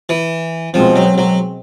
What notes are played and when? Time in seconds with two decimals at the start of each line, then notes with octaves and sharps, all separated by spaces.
0.09 E3
0.74 B2 F3 G#3 C4
0.96 F#3
1.18 F#3